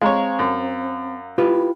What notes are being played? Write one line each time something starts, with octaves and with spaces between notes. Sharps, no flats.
G#3 C4 C#5 F5 A#5
F#2
E4 F4 G4 B4